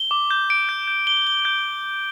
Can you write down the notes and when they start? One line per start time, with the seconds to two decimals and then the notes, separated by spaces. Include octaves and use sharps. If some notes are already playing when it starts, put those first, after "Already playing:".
Already playing: G7
0.11 D6
0.31 G6
0.50 D7
0.69 G6
0.88 G6
1.07 G7
1.27 G7
1.45 G6